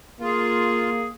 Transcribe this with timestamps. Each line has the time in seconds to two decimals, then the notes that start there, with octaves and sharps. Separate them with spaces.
0.20 A#3 F4 G#4